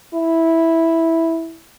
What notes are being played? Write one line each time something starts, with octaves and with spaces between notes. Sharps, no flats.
E4